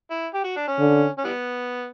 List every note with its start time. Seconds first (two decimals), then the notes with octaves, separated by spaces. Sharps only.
0.11 E4
0.34 G4
0.44 F#4
0.57 D4
0.68 C#4
0.79 D3
1.18 C#4
1.24 E3 G3 B3